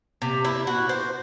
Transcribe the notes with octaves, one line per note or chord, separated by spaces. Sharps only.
C3
E4
F#4
C5